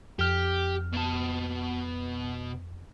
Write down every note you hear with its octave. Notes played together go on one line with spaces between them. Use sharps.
F2 G4 F6
B2 A5